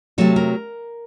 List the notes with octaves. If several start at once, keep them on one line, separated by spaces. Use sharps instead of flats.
C3 F#3 A3 A4
A#4